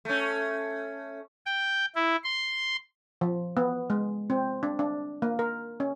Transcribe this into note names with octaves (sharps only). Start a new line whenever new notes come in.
A3 C#4
G5
E4
C6
F3
B3
G#3
C4
D4
D4
A#3
A#4
C#4